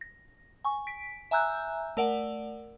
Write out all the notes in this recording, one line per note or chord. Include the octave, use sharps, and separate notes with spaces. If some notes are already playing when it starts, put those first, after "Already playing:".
A#6
G#5 C#6
B6 D7
E5 G#5 A#5 E6 F#6 G6
A3 A#4 D5 F#5